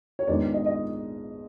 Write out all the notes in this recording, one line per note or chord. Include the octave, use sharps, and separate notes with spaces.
C#5
A#1 G#2 D#3 G#3 B3 D5
D#5
D#5